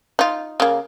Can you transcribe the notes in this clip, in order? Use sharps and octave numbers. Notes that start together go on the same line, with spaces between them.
D#4 F4
C#3 A#3